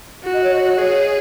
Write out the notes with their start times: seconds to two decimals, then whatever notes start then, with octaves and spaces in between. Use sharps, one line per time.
0.23 F#4
0.34 D#5
0.44 C#5
0.55 D#5
0.79 G#4 C#5